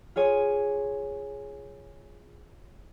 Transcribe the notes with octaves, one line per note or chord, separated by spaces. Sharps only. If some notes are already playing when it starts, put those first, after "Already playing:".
F4 G#4 C#5 G#5